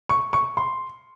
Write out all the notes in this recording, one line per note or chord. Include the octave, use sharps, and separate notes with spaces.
C#6
C#6
C6